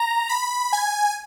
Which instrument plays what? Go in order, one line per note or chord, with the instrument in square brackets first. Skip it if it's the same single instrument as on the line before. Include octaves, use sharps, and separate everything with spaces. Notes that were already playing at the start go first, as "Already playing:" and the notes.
Already playing: [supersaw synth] A#5
B5
G#5